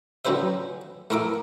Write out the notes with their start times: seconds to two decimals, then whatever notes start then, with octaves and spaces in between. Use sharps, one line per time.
0.25 D3 F#3 C#4 B4 C5 E5
1.10 A3 E4 A#4 E5 D6